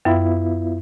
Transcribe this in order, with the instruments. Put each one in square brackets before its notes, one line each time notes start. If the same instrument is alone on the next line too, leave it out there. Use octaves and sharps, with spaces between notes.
[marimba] F#2 [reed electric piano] B3 E4 F4